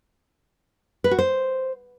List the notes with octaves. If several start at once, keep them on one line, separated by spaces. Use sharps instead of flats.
B4
F#4
C5